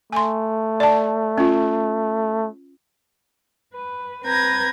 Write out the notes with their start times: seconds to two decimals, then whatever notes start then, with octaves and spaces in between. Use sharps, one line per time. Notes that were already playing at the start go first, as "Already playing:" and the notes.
0.13 A3 G#5 C6
0.80 D5 A5
1.38 C#4 F4
3.73 B4
4.23 C4 B4 A#5 G6 G#6 A#6